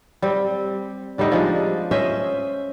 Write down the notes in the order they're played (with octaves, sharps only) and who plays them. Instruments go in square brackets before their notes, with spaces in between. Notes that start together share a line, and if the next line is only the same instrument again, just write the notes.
[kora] G3 C4
D3 G3 A3 D#4
F3 G#3 D4
C#4 C5 D#5 E5